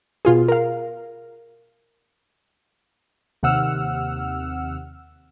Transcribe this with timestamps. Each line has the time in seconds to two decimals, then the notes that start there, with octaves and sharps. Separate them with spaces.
0.25 B2 F4 G#4
0.48 A#4 F5
3.43 D#2 C3 F#5 E6 F6